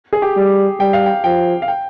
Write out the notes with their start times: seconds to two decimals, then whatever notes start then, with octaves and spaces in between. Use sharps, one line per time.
0.13 G#4
0.22 G4
0.36 G3
0.80 G3 G5
0.93 F5
1.06 G5
1.24 F3 G5
1.62 F5
1.68 G5